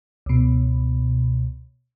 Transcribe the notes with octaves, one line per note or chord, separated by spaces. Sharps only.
C#2 B2